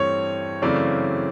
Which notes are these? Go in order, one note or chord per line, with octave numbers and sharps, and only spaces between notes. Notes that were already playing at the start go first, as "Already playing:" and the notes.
Already playing: G2 E3 A3 C4 C#5
F#2 C#3 E3 A3 C4 D5